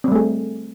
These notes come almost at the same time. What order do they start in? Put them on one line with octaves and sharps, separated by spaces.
C4 G3 A3 G#4